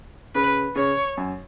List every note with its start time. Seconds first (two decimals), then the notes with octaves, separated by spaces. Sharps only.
0.35 C#3 B4
0.75 C#3 C#5
1.17 F#2